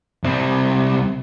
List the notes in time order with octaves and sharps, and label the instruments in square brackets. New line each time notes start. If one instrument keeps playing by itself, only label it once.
[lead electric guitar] C2 C4